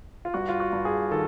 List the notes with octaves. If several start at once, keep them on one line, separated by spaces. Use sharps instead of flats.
F4
G2 F#4
F4
F#4
G2
G#4
D#3 A4